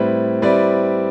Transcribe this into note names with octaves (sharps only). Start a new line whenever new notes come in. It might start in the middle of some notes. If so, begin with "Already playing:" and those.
Already playing: A2 G3 C4 E4 B4
G3 C4 E4 B4 D5